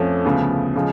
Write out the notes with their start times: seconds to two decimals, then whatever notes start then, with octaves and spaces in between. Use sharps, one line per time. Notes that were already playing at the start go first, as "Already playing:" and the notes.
Already playing: F2 F3 A3 C#4
0.25 D2 C#3 F3 B3
0.75 C#3 F3 G#3